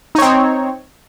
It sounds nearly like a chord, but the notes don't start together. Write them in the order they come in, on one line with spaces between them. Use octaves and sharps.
D#4 C#5 C4